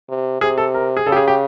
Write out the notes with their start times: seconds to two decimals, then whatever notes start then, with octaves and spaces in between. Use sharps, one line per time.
0.09 C3
0.41 C3 G#4
0.58 A4
0.74 A#4
0.97 G#4
1.06 C#3 A4
1.12 G4
1.16 G#4
1.28 G4